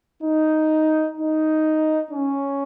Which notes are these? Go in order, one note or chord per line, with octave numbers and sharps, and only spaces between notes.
D#4
D#4
C#4